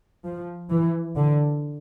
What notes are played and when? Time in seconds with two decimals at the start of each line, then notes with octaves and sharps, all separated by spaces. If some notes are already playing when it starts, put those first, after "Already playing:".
0.25 F3
0.70 E3
1.16 D3